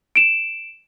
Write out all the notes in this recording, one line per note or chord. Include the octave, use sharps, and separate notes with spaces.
D7 E7